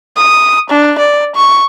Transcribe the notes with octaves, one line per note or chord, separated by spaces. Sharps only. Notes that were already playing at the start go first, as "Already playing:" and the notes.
D#6
D4
D5
C#6